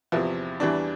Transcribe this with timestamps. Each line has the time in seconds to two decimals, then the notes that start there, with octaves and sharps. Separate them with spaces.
0.12 E2 C3 F3 E4
0.60 E2 E3 G3 D4